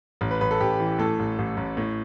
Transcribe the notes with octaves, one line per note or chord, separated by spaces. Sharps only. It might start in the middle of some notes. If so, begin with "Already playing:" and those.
A1
B4
A1 B4
A4
A1 G4
E3
A2 A4
A1
A1
A1
A2